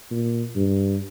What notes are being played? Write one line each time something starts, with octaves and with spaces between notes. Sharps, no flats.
A#2
G2